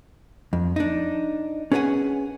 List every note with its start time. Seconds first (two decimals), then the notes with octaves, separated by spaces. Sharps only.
0.53 F2
0.76 D4 D#4
1.72 C#4 G#4 B4 C#5 F#5 G#5